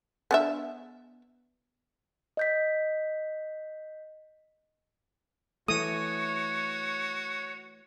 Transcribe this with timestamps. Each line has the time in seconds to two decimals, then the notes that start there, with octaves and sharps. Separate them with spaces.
0.31 B3 D4 E5
2.37 D#5 G6 B6
5.68 E3 A3 F#4 C#5 D#6